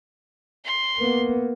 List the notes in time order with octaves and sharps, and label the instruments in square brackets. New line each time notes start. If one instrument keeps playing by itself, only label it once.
[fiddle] C6
[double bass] A#3 B3